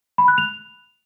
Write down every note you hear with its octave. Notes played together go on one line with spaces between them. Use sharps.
B5
F#6
F7